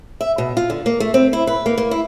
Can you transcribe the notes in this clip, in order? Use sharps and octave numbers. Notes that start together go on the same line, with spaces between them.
E5
B2
F4
D3
A#3
A3
C4
E4
B4
A#3
A#3
E4